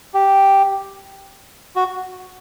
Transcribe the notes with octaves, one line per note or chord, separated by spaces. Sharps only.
G4
F#4